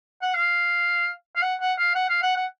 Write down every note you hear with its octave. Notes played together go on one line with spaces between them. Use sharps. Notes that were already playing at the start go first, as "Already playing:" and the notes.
F#5
F5
F5
F#5
F#5
F5
F#5
F5
F#5
F#5